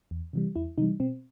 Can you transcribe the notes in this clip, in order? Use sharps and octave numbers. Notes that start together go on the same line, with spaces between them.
E2
C3 E3 G3
E2 E4
C3 E3 G3 D#4
B2 C4